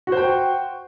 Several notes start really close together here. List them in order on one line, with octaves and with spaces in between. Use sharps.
F#4 C5 G5